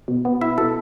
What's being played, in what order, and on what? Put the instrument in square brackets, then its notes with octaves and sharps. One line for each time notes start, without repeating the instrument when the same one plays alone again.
[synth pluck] B2
B3
E4 E5
B2 A4